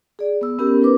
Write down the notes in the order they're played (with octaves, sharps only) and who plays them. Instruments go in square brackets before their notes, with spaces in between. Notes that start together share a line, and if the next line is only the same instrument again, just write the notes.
[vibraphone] G#4 D5
B3 E6
B3 C#4 G4 A#4
D#4 A#4 B4 D6